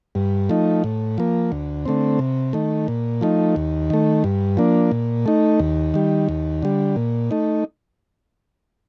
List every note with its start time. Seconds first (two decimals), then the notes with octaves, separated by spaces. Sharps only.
0.15 G2
0.49 F3 A3 D#4
0.84 A2
1.18 F3 A#3
1.52 D2
1.86 D3 A3 C4
2.19 C3
2.53 D#3 A3
2.88 A#2
3.21 F3 A3 D#4
3.56 D#2
3.90 D#3 A3
4.24 G2
4.57 F3 A#3 D4
4.91 A#2
5.26 A3 D#4
5.60 D#2
5.94 D#3 G3
6.29 D#2
6.63 D3 G3
6.96 A#2
7.31 A3 D#4